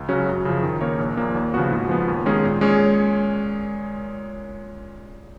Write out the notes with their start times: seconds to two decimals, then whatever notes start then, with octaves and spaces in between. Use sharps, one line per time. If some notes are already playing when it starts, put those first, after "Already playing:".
Already playing: C#2
0.09 C#3 F#3 C#4 F#4
0.27 F#2
0.45 C#3 F3
0.63 D#3
0.81 A#3 D#4 A#4 C#5
0.99 A#1
1.17 A#2 F3 A#3
1.35 D#2
1.54 C#3 F3 B3 F#4
1.71 G#2
1.89 F3 B3
2.08 D#2
2.26 D#3 G#3 C#4 G#4
2.44 A#2
2.61 G#3 C#4 G#4 C#5